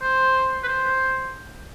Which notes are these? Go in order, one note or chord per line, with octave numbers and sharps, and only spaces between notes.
C5
B4
C5